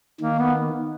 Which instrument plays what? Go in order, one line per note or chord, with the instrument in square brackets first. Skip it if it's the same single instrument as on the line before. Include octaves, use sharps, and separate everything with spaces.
[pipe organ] D#3 [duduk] A#3
[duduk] B3